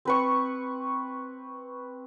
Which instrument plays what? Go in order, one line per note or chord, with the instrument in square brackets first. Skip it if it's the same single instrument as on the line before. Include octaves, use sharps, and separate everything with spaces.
[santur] C4 B4 C#6